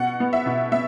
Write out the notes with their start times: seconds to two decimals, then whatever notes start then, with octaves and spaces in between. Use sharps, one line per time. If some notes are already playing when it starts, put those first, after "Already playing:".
Already playing: B2 F#5
0.20 B3
0.33 E5
0.46 B2
0.72 B3 E5